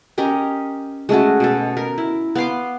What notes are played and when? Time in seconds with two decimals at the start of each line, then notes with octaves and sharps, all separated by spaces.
0.18 C#4 G4 A#4 D#5
1.09 G#3 A3 C#4 F#4
1.40 B2 A4
1.77 A#4
1.98 E4
2.35 B3 F5 C6 D6